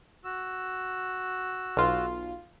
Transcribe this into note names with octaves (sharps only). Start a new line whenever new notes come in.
F#4 E6
B1 F4